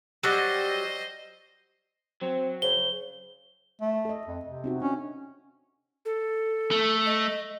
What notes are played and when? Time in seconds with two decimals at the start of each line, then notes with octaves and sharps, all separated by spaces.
0.23 F#3 G3 G4 C5 D#5
2.22 F#3 C4
2.62 C#3 C5 G7
3.82 A3
4.05 A4 D#5
4.27 F2
4.45 C3
4.64 C4 D#4 F#4
4.82 C#4 D4
6.05 A4
6.71 A3
7.06 D#5